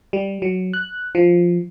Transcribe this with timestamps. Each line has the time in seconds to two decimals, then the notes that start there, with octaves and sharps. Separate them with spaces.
0.13 G3
0.42 F#3
0.73 F#6
1.15 F3